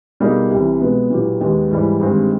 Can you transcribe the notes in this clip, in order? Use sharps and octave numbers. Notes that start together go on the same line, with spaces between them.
B2 G3 A#3 D#4 G#4
C2 C3 E3
B2 G#3 B3
A#2 F#3 B3 E4 G4
D#2 D#3 G#3 B3
G#2 E3 G3
G2 D#3 G#3 C4